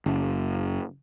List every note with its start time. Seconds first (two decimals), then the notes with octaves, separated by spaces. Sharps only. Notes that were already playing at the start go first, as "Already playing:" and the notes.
0.06 F#1